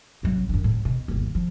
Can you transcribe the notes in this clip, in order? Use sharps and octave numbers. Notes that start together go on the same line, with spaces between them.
A1 F#3
F#2 D3
A2
B2
G1 D#2
F3